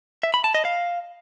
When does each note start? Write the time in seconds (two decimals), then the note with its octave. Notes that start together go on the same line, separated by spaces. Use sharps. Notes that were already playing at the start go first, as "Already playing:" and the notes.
0.23 E5
0.34 B5
0.44 A5
0.55 D#5
0.65 F5